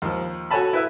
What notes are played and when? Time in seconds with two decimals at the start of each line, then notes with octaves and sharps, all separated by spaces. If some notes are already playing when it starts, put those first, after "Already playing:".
0.02 D#2 F3
0.51 F#4 A4 C#5 G#5 A5 B5
0.73 E4 B4 E5